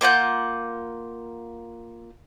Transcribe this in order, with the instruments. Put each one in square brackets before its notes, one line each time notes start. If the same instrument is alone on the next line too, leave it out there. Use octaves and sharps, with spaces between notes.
[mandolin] A#3 F4 F#5 G6